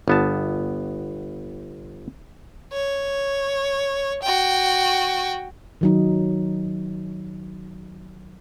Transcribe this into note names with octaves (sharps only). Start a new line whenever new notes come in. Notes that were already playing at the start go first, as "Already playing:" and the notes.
G1 B3 A5
C#5
F#4 G5
D#3 F#3 D#4